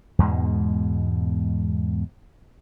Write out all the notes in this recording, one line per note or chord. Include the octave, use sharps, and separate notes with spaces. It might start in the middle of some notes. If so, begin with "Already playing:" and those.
E2 G#2 B2 G#3